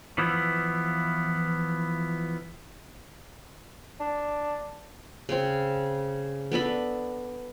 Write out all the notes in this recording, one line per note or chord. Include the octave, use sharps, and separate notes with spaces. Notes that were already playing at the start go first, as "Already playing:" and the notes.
E3 F3 B3 E4
D4
C#3 C4
B3 D4 A4 B5